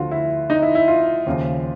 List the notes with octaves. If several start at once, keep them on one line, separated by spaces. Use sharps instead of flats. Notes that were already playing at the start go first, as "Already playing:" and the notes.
Already playing: D2 D3 F3 F4 F#4
E4
D#4
E4
E4
F4
D#2 C#3 F3